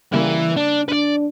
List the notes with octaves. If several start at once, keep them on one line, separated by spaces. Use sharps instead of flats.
C#3 E3 G3 A#3 E4
D4
D4 B4 D5